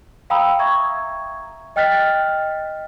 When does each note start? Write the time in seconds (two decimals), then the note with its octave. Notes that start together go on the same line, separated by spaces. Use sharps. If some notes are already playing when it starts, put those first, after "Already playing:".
0.30 F5 G5 A#5 B5 D#6 E6
0.59 E5 A#5 C#6 G#6
1.76 D#5 G5 F6 F#6 A6 B6